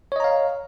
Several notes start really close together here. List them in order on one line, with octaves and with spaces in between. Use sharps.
C#5 D#5 A#5 F5